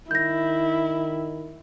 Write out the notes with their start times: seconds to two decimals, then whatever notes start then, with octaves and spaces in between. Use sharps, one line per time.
0.11 D#3 E4 G6 A#6